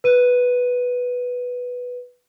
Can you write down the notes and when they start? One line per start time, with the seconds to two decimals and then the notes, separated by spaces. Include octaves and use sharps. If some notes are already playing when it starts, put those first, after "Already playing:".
0.04 B4 D#7